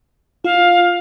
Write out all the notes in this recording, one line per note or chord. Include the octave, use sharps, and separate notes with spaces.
F4 F5